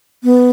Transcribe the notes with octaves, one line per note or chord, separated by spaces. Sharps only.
B3